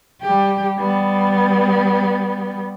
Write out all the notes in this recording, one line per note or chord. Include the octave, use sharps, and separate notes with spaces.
G3 G4
G3 B3